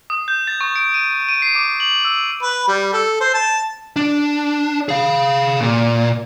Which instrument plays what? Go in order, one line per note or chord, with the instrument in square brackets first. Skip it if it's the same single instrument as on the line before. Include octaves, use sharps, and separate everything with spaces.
[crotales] D#6
G6
A6
C#6
D7
D#7
D#7
C7
D6
F#7
E6
[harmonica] B4
G3
A4
C5
A5
[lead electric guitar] D4
G#4 F5
A#2